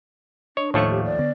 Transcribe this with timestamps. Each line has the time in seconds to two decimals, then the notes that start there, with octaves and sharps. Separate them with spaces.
0.57 D4 C#5 D#5
0.74 D#2 A2 F3 A3 C#5 A5 C#6
0.90 G4
1.05 D5
1.19 D3 B3